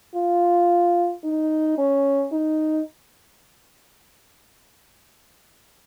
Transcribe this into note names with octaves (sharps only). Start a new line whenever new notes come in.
F4
D#4
C#4
D#4